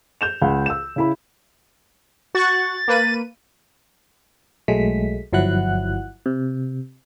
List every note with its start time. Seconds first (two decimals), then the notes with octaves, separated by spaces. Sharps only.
0.21 G6 E7 F7
0.42 C#2 F#5
0.66 E6 E7
0.96 C#3 E4 B5
2.35 F#4 C#6 F#6 A6
2.88 A#3 B4 D#7
4.68 B1 F#3 G#3 A3 B6
5.33 G1 F3 F#3 E4 F#5 F#6
6.26 C3